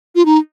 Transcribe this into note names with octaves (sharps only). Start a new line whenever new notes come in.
F4
D#4